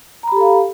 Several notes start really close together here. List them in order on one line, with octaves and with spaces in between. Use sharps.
A#5 B5 G4 A4 F5